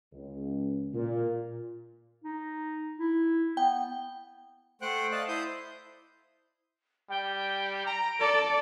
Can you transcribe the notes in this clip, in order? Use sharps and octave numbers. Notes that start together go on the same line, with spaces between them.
C#2
A#2
D#4
E4
B3 G5
A3 C5 F#5 G5 F#6
D5 D#5 F5 A5 F#6
E4 C5 D#6 G6
G3 G5
A#5 D7
A4 D5